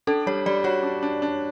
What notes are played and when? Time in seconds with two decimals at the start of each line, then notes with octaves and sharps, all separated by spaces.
0.07 D4 A4
0.26 G3 C#5
0.46 G3 D5
0.64 F#4 C#5
0.83 D4
1.03 D4
1.22 D4